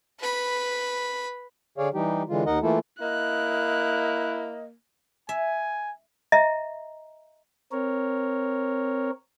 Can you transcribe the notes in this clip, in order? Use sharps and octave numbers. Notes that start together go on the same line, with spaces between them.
B4 B5
D3 G#4 C#5 D5 F5
E3 G3 D#4 G4
D3 E3 G#3 F4
D#2 D#4 A#4 D#5 F#5
E3 A3 A#3 E4 F4 A4
A#3 E4 D#5 F#6
E5 G#5
D#5 E5 A#5
C4 A#4 C#5